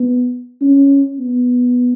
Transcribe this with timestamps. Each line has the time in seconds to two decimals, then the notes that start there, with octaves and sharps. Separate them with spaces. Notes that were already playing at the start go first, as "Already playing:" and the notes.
Already playing: B3
0.61 C#4
1.19 B3